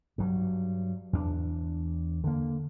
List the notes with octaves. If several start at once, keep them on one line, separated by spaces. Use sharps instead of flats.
G2 F#3
E2 D4
D3 A#3